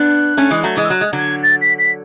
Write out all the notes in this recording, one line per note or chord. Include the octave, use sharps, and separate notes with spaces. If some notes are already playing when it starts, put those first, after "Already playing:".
Already playing: B3 D4 F#6
A3 C#4
E3 G#3
F#3 A3
E3 G#3
E6
F#3 F#6
G#3
D3 F#3 G#6
A6
B6
B6